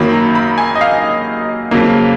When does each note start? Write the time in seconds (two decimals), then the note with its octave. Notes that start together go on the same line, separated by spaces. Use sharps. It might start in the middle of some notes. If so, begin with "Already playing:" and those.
Already playing: F#2 D#3 F#3 A#3 B5
0.13 A#5
0.35 B5
0.58 G#5
0.75 D#5
0.81 F5
1.71 F2 C#3 F#3 A#3